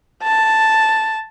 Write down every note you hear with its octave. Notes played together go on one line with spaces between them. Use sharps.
A5